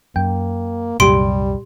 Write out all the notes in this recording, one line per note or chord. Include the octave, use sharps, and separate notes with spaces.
F#2 A#3 G5
C2 F#2 A#2 G3 G4 C6 D7